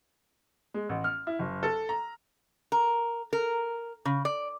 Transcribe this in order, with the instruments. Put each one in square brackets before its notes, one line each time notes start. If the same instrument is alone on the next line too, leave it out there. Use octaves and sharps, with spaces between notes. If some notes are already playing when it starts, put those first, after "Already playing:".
[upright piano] G#3
A1
F6
E4
F#1
A4
A#5
[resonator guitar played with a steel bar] A#4
A#4
C#3
D5